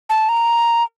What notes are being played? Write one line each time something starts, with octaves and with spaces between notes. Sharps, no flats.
A5
A#5